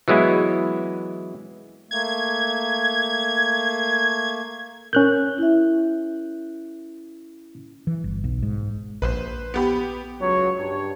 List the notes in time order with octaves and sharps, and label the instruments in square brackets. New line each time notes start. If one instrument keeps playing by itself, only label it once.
[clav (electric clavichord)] E3 F#3 G#3 B3 E4
[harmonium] A3 A#3 [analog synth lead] G#6
[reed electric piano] C#4 F#6 G6 [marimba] A#4
[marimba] E4 E5
[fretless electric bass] E3
G1
B1
G#2
[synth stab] A#1 [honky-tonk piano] B4 C5
[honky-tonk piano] B3 G4 B5
[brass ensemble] C#2 F#3 C#5
G2 C#5